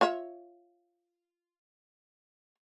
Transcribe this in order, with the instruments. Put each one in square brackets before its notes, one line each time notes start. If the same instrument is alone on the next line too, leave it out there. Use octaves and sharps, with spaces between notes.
[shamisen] F4 C#5 E5